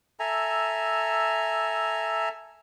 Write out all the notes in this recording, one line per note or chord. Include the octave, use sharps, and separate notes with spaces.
A4 E5 G#5 A#5